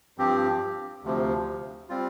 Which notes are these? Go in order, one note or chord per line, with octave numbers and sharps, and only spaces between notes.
G2 F3 C4 G4
D2 C3 F3
G3 C4 F4